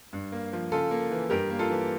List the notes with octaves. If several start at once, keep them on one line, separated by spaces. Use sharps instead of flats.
G2
A#3
F3
C#3 F4 A4
A#3
E3
G2 G4 A#4
A#3
F4 A4
E3